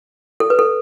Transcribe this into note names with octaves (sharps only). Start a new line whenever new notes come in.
A4
B4
A4